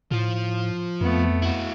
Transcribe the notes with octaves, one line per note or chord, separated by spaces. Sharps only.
A2 F3 F4
F2 A3 B3
E4 F#4